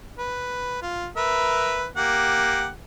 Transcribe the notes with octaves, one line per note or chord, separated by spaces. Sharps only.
B4
F4
A#4 B4 E5
A#3 G4 F#5